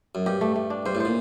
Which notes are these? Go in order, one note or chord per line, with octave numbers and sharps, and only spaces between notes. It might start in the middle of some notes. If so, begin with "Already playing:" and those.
F#2
G2 G4
A3
A3
D4
G2 C5
A2
C5
A#2